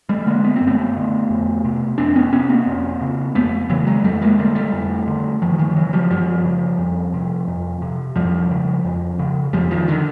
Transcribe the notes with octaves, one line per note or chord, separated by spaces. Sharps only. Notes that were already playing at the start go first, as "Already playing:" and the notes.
G3 A3
D3 G#3 A#3
B3
C4
F#2
A3 B3
D3
F2
C3
F2 C4 D4
B3 C#4
C3 B3 C#4
A#3 C4
F2
C#3
F2 A3 B3
C#3 E3 F#3
F#3 G#3
F2 G3 A3
G#3 A#3
D3 G3 A3
G3 A3
F2
D3
F#2 D#3 F3
D#3 F3
C#3 E3 F#3
F3 G3
F#2 F3 G3
C#3
F2
C3
F2
C3
F2 F3 G3
C#3
F2
C#3
F2 F3 G3
D#3 F3
D3 D#3